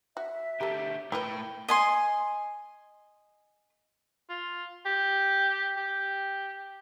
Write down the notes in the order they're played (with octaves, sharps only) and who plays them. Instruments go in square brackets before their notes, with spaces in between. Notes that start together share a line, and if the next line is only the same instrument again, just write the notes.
[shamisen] F#4 [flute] E5
[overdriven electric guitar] D2 G4 [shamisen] A4 A#4
[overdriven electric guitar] A2 G5 [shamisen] E4 A#4 B4
[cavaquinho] D#5 G#5 C6
[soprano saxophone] F4
G4
G4